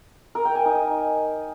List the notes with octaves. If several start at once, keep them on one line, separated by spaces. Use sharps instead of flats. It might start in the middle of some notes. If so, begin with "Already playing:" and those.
A#4
G5
G#5
D#4
D#5